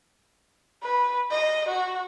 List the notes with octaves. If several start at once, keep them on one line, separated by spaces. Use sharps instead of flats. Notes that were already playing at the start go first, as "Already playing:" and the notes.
B4
D#5
F#4